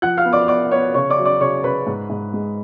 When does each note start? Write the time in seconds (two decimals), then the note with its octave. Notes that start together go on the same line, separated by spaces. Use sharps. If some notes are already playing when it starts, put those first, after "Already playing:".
0.02 F3 F#5 F#6
0.17 F5 F6
0.25 B3
0.33 D5 D6
0.48 B3 D5 D6
0.71 B3 C#5 C#6
0.94 C#3 C#5 C#6
1.10 D5 D6
1.18 F#3
1.25 D5 D6
1.40 C#3 C#5 C#6
1.64 C#3 B4 B5
1.87 G#2
2.10 G#2
2.33 G#3